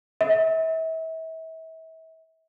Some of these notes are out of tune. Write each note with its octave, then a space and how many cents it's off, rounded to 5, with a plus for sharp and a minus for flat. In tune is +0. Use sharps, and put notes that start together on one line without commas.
E5 -35